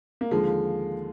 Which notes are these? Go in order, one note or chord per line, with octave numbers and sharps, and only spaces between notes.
A#3
D#2 D3 F3 G#3